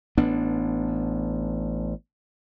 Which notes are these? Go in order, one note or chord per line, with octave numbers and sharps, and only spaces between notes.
A1 B3 D4